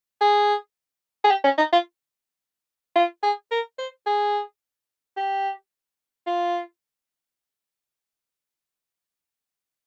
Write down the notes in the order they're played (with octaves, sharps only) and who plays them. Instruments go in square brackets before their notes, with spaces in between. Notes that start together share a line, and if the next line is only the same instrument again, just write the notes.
[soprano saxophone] G#4
G#4
G4
C#4
D#4
F4
F4
G#4
A#4
C5
G#4
G4
F4